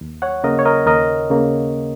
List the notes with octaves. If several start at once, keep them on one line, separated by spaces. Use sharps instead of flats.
D#2
C#5 F#5
C#3 A#3 A#4 D#5
C#5
A#4 D#5
D#2 A#4 D#5
C#3 A#3